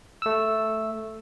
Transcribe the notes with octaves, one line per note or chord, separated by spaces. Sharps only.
A3 E6